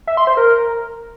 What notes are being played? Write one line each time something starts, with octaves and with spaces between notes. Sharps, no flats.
E5
C6
C5
A#4